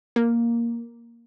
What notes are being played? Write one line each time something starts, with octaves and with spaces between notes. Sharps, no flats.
A#3